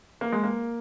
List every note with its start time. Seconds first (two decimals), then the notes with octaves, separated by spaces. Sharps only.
0.21 A#3
0.32 G#3
0.44 A#3